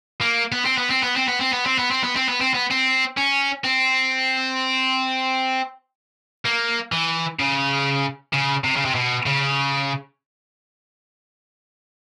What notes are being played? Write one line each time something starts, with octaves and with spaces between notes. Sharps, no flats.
A#3
B3
C4
B3
C4
B3
C4
B3
C4
B3
C4
B3
C4
B3
C4
B3
C4
B3
C4
C#4
C4
A#3
E3
C#3
C#3
C3
C#3
C3
B2
C#3